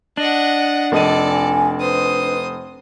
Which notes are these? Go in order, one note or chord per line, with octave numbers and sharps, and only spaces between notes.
D4 D#5 F#5
F1 A4 D5 D#5 D#7
G#5
B4 C5 D#6